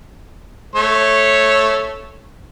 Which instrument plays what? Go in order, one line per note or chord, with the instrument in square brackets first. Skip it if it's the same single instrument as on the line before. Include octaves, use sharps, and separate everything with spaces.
[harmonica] A3 C#5